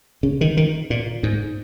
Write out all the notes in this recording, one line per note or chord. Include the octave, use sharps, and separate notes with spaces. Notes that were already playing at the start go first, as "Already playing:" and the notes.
C#3
D#3
D#3
A#2
G#2